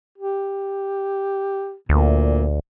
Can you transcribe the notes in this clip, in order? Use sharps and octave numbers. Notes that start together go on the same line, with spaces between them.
G4
D2 A#2